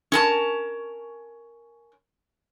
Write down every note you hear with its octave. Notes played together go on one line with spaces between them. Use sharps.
C#4 A#4 A5